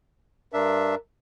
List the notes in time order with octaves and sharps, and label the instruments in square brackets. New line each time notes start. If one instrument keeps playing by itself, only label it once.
[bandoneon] G2 D4 E5 [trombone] A#4